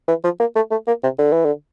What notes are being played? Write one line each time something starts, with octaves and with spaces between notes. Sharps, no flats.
E3
F3
A#3
A3
A3
A#3
C3
D3
E3
D3